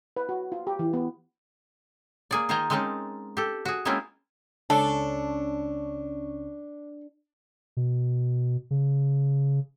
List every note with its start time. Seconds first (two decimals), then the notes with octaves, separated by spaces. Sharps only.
0.16 B4
0.29 F#4
0.52 F4
0.67 G4
0.79 E3
0.93 B3
2.31 A#3 G#4 D5
2.49 D#3 F4 C5 D#5 G#5 A#5
2.70 G#3 C4 C#4 D#4 A#4 A5
3.37 G4 A4
3.65 F#4 G#4
3.85 G#3 A#3 C4 C#4 E4 F4
4.70 C#2 C#4 D4 A4 C#6
7.77 B2
8.71 C#3